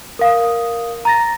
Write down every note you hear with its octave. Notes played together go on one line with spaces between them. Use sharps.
A#4 F5 D#6
A#5 A6 A#6